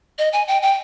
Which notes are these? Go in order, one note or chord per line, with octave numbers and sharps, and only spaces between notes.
D#5
G#5
G5
G5